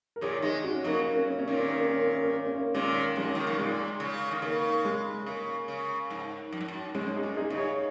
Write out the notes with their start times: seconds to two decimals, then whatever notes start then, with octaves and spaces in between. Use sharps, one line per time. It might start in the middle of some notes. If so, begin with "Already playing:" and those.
0.16 A#4
0.21 A#2 D#3 G#4 C#5
0.42 D#3 G#3 D#4 G#4
0.64 C#4 F#4
0.84 C#3 F#3 A#3 D#4
1.06 A#3
1.17 C#4
1.28 A#3
1.39 C#4
1.48 A#2 D#3 A#3
1.60 C#4
1.71 A#3
1.82 C#4
1.92 A#3
2.03 C#4
2.14 A#3
2.25 C#4
2.35 A#3
2.47 C#4
2.58 A#3
2.74 A#2 D#3 G#3 C#4
2.95 A#3
3.16 F#2 G#3 C#4
3.35 D#3 A#3
3.47 C#3
3.58 A#2 G#3
4.00 C#3
4.31 D#3
4.42 C#3 A#3
4.85 G#3
5.26 C#3 A#3
5.68 C#3
6.10 G#2
6.53 F#2
6.60 G#2
6.68 F#2
6.95 G#2 G#3 C#4
7.16 D#4 G#4
7.23 A#2
7.37 D#4 G#4
7.50 C#3 D#5
7.57 G#4 C#5